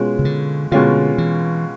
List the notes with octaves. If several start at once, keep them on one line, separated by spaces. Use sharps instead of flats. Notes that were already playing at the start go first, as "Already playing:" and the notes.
Already playing: B2 G#3 C#4 F4
C#3
D3
B2 D3 G#3 C#4 F4
E3